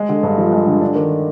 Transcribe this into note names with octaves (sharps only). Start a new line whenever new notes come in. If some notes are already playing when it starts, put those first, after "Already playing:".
Already playing: G#3
D3
G2
F3
G#3
D3
D4
D#3